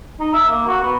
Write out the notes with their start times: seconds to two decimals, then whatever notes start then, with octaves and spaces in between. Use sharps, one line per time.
0.20 D#4
0.33 E5
0.48 A#3
0.67 F#4
0.83 B3